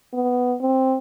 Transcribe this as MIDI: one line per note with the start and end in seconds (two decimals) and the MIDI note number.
0.14 0.55 59
0.61 0.97 60